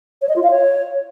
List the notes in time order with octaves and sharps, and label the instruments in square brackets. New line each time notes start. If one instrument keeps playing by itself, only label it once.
[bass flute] C#5
D#5
F4
F5
C#5